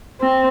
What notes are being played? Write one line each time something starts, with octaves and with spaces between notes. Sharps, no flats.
C4